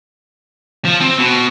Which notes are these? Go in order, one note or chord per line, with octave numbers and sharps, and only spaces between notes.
F3
C4
B2